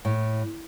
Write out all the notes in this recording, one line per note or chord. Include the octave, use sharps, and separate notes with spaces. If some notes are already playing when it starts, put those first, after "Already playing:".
A2